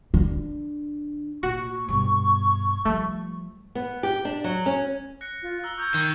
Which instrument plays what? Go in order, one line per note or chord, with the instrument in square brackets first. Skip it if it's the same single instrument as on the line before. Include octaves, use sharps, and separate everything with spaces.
[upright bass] D3
[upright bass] A#2 [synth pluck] F#4 [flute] C#6
[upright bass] G2 B2
[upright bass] F3 G3 [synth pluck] A3
[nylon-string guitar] B3
G4
D4
F#3
C#4
[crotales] F#6 A#6 C#7
[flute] F4
[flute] A#5 [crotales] E6 F6 G7
[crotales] C#6 D#6 G#6 [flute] G6
[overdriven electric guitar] D#3